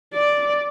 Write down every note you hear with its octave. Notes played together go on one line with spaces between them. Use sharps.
D5